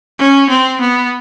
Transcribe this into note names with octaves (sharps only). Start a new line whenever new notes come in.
C#4
C4
B3